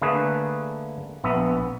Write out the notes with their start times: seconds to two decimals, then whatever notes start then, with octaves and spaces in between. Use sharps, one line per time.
0.02 D3 A3 A#3 G#4 B4
1.24 A#1 B3 E5